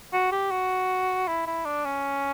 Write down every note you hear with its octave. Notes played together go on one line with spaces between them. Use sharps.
F#4
G4
F#4
E4
E4
D4
C#4